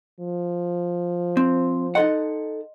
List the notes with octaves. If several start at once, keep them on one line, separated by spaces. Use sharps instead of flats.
F3
C4
D#4 A4 D#5 F#5 C6